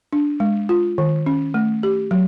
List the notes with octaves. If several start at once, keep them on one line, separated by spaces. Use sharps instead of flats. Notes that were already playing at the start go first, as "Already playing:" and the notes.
D4
G#3
F4
D#3
C#4
A3
G4
F#3